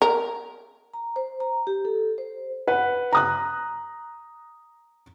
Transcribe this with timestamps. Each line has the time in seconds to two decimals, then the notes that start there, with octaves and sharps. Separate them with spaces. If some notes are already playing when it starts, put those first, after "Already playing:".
0.02 A#4
0.94 A#5
1.16 C5
1.40 A#5
1.67 G4
1.85 A4
2.18 C5
2.67 B4 F#5
3.13 A#5 D#6 F#6